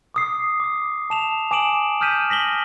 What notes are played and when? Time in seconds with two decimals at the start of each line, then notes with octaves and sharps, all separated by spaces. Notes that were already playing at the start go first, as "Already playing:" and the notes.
0.14 D6 D#6 C7
0.60 D6 D#6
1.10 A5 E7 F7
1.51 G#5 D6 D#6 D7 E7 F#7
2.01 D#6 F6 G6 B6 D#7 E7
2.30 A#6 B6 F#7 G7